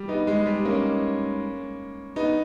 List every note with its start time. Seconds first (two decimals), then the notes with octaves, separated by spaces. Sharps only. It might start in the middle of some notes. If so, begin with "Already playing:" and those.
Already playing: G3
0.08 B3 D#4
0.27 G#3
0.46 G3
0.65 A#3 C#4
2.16 B3 D#4